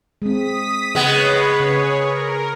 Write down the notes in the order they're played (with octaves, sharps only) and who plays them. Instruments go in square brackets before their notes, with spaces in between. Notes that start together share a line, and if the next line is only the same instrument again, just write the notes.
[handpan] G#3 C4 [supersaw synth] D#6 B6
[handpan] C#3 [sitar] G#3 B3 [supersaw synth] B4 C#5
[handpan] C#3 [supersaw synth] G#4 C#5
[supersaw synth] A#4